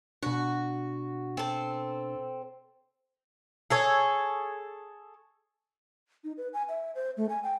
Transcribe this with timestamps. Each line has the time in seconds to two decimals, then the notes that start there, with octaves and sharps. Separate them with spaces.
0.23 B2 D4 F#4
1.37 C4 A4
3.70 G#4 A4 C#5
6.24 D#4
6.38 B4
6.54 G#5
6.69 E5
6.95 C5
7.17 A3
7.29 G#5
7.43 G5